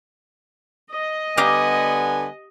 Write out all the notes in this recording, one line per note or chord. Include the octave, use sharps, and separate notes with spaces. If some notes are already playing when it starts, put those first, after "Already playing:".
D#5
D3 G3 B3 G4 F5 G#5 A#5